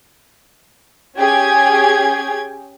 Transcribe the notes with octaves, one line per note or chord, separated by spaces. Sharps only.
C#4 G4 G#4 G5 G#6